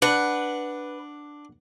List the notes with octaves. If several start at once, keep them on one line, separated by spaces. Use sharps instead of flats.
D4 B4 F#5